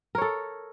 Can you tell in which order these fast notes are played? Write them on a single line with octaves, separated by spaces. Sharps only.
A#4 C#5 A4